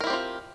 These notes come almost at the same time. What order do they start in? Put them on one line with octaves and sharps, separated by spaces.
A#4 E4 G4 C4 F4